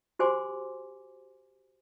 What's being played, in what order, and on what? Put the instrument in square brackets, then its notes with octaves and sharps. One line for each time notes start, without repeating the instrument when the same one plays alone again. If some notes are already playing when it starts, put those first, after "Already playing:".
[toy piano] F#4 G4 C5 G#5 C6 D6